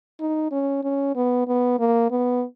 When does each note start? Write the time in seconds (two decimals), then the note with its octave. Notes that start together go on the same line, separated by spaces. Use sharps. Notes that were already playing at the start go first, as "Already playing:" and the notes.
0.20 D#4
0.51 C#4
0.84 C#4
1.16 B3
1.48 B3
1.79 A#3
2.11 B3